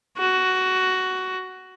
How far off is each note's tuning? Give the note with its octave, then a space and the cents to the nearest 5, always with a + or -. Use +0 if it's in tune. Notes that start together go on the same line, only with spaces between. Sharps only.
F#4 +10